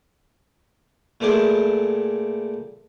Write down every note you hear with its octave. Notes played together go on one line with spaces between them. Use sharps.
A#2 A3 E4 G4 G#4